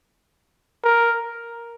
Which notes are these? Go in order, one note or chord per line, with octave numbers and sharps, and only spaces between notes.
A#4